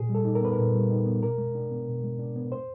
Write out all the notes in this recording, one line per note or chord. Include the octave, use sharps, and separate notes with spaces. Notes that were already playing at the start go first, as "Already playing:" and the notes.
Already playing: A#2 G#4
G3
A4
D#4
A#4
B3 B4
A#2 A#4
G3
D#4
B3
B2 A#4
G#3
D4
B3
B2
G#3
D4
B3
C5